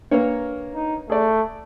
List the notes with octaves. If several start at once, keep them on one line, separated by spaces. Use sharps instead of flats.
A#3 D4 A#4 B4 C#5
D#4
A3 G#4 D5